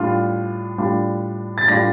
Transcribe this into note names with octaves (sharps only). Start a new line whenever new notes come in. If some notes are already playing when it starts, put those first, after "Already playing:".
Already playing: A2 G3 D4 F4
A2 G3 D4 F4
A6
A2 G3 D4 F4 A#6